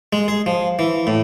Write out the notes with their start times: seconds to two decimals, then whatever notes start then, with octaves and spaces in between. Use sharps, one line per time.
0.13 G#3
0.28 G#4
0.46 F3
0.79 E3
1.07 A2